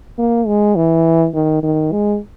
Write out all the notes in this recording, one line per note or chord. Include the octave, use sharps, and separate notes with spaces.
A#3
G#3
E3
D#3
D#3
G#3